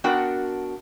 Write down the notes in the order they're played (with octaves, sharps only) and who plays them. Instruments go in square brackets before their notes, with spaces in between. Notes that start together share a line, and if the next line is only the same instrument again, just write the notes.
[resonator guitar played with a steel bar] B3 D4 F#4 A#4 F#5 G5